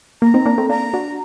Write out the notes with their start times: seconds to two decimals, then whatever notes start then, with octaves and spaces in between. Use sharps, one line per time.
0.22 A#3 A#5
0.34 C4 D#4
0.46 A#3 D4
0.58 A3 C4
0.69 A#3 D4 A#5
0.94 D4 F#4